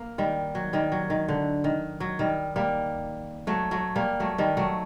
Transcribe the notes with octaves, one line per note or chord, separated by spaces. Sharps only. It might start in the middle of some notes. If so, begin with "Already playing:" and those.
Already playing: A#3
D#3 G3
F#3
D#3 G3
F#3
D#3
D3
D#3
F#3
D#3 G3
G3 A#3
F#3 A3
F#3 A3
G3 A#3
F#3 A3
D#3 G3
F#3 A3